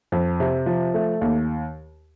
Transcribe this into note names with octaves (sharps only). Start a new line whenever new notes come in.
F2
C3
F3
A3
D#2